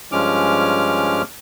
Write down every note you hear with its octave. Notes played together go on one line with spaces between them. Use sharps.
G2 F3 G#3 C#4 D6 F6